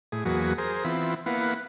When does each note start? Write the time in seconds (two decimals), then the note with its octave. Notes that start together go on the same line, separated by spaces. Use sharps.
0.12 A2 G#4
0.25 E2 F#3 A#3 F#4 G#4 B4
0.58 G#4 A#4 C5
0.84 E3 B3 C4 F4 E5 B5
1.26 A#3 B3 E4 B4 F5 F#5